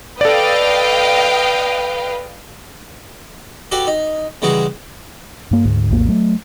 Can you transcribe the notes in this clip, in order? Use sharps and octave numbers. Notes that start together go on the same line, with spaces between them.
A4 B4 D5 D#5 F5 G5
F#4 G4 A4 B4 D5
D#4
C#3 E3 G3 G#3 F#4 G#4
G2 A#3
D2 G#2
A#1 E2 A2 A#3
F#3 A3